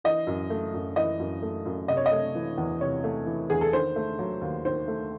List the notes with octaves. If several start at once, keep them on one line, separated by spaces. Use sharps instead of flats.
E3 D#5
F#2
A3
F#2
E3 D#5
F#2
A3
F#2
C3 D#5
C#5
D#5
A3
E3
E2
C3 C#5
A3
E3
E2 G#4
A4
D#3 C5
A3
F#3
D#2
D#3 C5
A3